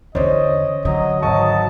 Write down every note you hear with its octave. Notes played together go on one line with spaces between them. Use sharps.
E2 D3 C#4 C5 D5 D#5
D3 F#3 D#5
G#1 F#3 D#5 A5 C#6 D#6